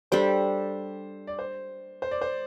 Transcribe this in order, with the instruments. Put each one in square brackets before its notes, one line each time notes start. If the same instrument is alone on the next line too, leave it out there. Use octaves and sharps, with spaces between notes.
[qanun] G3 D4 A4 [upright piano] C5
[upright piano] D5
C5
C5
D5
C5